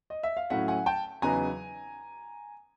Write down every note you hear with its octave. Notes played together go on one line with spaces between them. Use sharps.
D#5
E5
F5
A2 F#3 A3 C#4 E4 E5 F#5
F#5 G#5
G5 A5
E2 C#3 F#3 B3 D#4 G#5 A#5